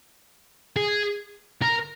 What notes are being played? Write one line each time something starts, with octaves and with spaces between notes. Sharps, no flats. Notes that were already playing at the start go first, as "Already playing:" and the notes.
G#4
A#4